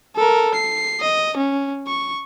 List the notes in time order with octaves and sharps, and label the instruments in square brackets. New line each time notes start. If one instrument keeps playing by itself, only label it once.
[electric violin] A4 A#4
C7
D#5
C#4
C#6